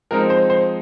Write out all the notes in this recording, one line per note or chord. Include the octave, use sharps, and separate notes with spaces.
F3 G#3 C4 D#4 A#4
C5
C5